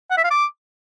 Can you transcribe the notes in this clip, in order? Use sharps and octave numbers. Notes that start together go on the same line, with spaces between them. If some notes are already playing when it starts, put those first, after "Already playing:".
F#5
E5
F5
D6